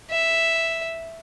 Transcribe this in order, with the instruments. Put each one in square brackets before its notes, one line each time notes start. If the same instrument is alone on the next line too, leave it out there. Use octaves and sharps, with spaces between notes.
[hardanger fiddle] E5